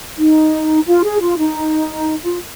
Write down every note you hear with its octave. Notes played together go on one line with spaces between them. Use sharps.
D#4
F4
G#4
F4
D#4
F4